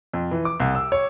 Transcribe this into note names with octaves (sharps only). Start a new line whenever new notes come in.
F2
E3
D6
C2
E6
C#5